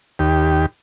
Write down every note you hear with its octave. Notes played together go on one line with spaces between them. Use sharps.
D#2 G4